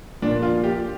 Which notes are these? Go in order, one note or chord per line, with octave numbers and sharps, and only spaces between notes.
A#2 F3 D4
F4
G4